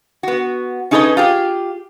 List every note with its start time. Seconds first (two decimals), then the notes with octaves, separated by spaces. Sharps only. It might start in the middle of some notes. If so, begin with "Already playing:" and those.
0.23 B3 F#4
0.91 C#4 D#4 G#4 A4 B4 D#5
1.17 F4 G4 G#4